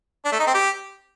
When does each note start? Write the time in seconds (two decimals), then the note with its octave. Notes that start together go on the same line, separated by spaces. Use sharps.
0.25 D4
0.32 A3
0.40 D#4
0.47 C4
0.54 G4